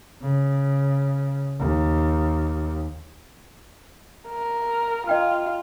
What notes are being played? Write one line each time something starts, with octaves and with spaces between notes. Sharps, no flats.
C#3
D#2
A#4
F4 D#5 G5 F6